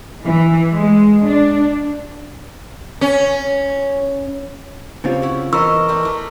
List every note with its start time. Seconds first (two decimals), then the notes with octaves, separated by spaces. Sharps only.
0.24 E3
0.77 G#3
1.27 D4
3.01 C#4
5.04 C#3 G3 C4 F4 C#5
5.22 C#4 E4 F#5
5.53 E3 B3 A#4 C5 D#5 C#6 E6
5.89 A3 C4 D4
6.03 E3 A3 D4